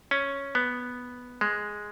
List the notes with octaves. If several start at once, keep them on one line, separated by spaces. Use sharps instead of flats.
C#4
B3
G#3